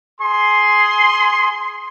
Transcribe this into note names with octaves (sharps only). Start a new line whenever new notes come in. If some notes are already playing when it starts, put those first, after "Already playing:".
G#4 C6